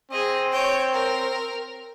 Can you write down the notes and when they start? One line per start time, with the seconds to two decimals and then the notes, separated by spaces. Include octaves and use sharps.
0.11 C4 G#4 D#5
0.52 C#5 G5
0.92 A#4